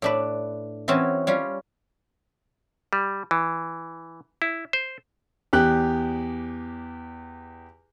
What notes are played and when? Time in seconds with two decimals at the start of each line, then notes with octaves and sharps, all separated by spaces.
0.02 A2 D4 B4
0.88 E3 C4 C#4 F#4 G#4 A5
1.27 G3 C#4 F4
2.93 G3
3.31 E3
4.42 E4
4.73 C5
5.53 E2 G4 F#6